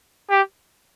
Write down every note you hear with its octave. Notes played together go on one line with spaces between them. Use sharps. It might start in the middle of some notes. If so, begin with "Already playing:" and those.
G4